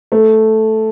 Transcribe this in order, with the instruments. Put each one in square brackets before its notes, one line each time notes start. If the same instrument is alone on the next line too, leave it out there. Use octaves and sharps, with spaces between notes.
[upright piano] A3